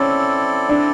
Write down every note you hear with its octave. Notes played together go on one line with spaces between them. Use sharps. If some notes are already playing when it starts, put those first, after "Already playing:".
Already playing: C4 C#4 E4 A4 D5
D4